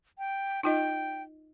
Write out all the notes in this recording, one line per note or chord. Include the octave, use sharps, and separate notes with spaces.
G5
D#4 F4 D#5 G5